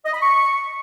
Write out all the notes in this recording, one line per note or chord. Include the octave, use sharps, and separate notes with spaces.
D#5
B5
C#6